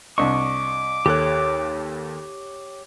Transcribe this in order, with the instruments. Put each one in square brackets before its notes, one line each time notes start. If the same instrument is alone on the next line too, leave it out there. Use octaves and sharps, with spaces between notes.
[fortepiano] C2 D4 [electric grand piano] D#5 [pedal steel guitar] C#6 [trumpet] D6
[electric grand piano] D#2 A4 F#6 [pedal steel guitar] G4 C#5